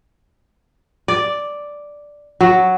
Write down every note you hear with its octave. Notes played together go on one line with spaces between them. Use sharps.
D5
F#3